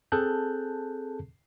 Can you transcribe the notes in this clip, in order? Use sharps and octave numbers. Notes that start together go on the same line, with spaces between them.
C4 G#4 A4 A5 F#6 G6